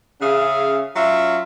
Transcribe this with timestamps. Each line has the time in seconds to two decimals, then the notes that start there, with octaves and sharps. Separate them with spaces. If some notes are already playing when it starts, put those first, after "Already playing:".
0.21 C#3 C#4 G#4 E5 F5
0.96 F#3 C#4 F4 E5